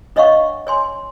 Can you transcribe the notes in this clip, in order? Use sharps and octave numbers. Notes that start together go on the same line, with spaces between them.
D4 C#5 D#5 F5 F#5 C#6
C#5 G#5 C6